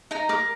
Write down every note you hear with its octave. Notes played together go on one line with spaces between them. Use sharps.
D#4 A#5
A#4 D6